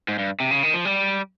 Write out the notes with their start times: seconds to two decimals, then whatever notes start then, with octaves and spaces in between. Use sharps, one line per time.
0.08 G#2
0.19 G2
0.40 C3
0.51 C#3
0.63 D#3
0.74 F3
0.85 G3